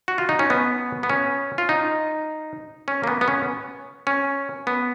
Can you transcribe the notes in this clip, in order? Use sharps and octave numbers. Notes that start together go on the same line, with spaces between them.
F#4
F4
D#4
C#4
B3
B3
C#4
F4
D#4
C#4
A#3
B3
B3
C#4
C#4
B3